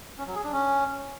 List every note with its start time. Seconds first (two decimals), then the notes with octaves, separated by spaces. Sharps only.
0.18 C#4
0.27 F#3
0.35 G#4
0.44 D4
0.53 C#4